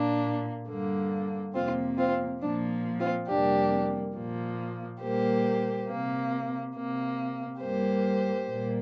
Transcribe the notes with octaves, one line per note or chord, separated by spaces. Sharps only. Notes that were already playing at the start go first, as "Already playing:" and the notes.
Already playing: A#2 A#3 D4
G2 D3 A#3
F2 C3 A#3 C4 F4
C4 F4
A#2 F3 A#3 D4
C4 F4
F2 C3 G3 A#3 D4 G4
A#2 F3 A#3
A#2 G3 A#3 G4 C5
C3 A#3
C3 A#3
G2 G3 A#3 G4 C5
A#2 G3 A#3